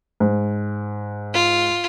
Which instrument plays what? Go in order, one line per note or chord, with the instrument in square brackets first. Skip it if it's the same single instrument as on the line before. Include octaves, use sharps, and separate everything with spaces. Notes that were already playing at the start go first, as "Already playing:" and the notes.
[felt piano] G#2
[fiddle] F4